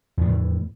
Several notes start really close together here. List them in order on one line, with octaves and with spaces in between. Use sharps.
E2 F3 A2 E3